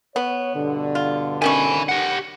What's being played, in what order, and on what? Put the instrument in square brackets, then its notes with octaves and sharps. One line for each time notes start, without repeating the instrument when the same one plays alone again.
[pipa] B3 [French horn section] C#5
[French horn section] G2 B2 D3
[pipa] F4
[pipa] D#3 C#4 C#6 [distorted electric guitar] G#5 B5
[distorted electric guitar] G4 F#5